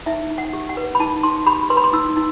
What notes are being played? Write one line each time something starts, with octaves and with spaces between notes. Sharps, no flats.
D#4 E5
D#4
F#5
G4
F#5
B4
B5
D#4 A5
D#4 C6
G4 B5
B4 C6
B5
C6
D#4 E6
D#4